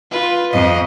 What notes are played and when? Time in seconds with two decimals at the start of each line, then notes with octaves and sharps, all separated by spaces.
0.11 F4 B4
0.53 F2 D#5